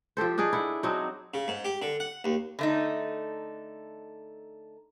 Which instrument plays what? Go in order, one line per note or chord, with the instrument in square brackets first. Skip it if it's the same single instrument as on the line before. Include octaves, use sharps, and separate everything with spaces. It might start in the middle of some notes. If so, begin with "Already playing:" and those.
[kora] F3 G4 A4 C5
D4 D#4 G#4 D5
E4 F#5
F#3 C4 D4 D#4
[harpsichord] C#3
G#2
G4
D3
F#5
D#2
[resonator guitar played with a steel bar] D3 A3 D#4